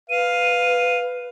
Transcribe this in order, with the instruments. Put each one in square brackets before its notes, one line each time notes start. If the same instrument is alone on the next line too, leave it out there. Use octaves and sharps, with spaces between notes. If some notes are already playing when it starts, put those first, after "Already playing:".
[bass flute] B4 [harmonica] F5 [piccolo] D#7